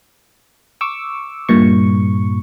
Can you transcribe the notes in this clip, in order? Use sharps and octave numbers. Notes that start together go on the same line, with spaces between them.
C#6 D6 E6
G2 A#2 C#6